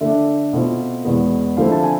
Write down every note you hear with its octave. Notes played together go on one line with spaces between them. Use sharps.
D3 A3 D4 E5
B2 A3 C4 F4
E2 B2 G#3 B3
D3 F3 A3 C4 E4 F5
A5
G#5